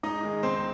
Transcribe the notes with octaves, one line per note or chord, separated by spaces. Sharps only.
G#2 D#4 D#5
D#3 G#3
C#2 C4 C5